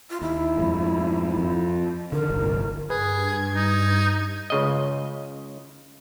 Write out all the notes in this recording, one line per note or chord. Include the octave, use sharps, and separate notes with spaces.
F4
D#2 E4
F2 G#2
F2
D3 D#3 A#4
D1 G1 C2
G2 G#4 B4 G#6
D#4
C#2 C#3 D#5